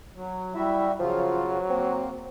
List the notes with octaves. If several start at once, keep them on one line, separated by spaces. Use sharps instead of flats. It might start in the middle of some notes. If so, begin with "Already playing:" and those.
F#3
G3 E4 F#4 E5
C#3 F3 F#3 F4
A#3 C4